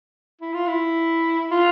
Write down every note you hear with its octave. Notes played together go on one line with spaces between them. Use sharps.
E4
F4
E4
F4